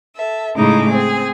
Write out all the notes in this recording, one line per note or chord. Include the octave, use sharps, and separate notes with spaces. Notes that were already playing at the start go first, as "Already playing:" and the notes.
A4 E5
A2 C#3 G#3 D#4 E4 D6
C4 G#4